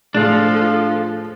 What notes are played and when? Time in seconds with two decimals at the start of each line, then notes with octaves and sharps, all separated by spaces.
0.15 A2 F3 D4 F4 G#4 A4